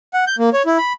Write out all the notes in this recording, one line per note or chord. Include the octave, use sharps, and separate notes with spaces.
F#5
G6
A#3
C#5
E4
B5